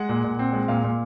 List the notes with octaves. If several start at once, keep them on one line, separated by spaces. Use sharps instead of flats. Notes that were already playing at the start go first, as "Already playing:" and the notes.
Already playing: G#3 F#5
A#2
A#2
C4
G#3
A#2 F5
A#2